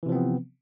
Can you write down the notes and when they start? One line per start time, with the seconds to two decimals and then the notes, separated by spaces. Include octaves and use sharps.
0.03 E3
0.06 C3
0.09 F3
0.12 C4
0.15 B3